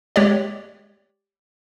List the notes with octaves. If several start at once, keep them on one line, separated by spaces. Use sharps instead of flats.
G#3 G4 C#5 D5